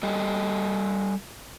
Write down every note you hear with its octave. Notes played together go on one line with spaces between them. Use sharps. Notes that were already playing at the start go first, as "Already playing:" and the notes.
G3 A4 D#5